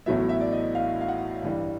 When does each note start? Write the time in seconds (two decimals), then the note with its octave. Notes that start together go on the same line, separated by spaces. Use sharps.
0.06 A1 A2 F#3 B3 E5
0.29 E5
0.41 D5
0.52 D#5
0.75 F5
1.01 F5
1.08 F#5
1.43 G2 E3 G3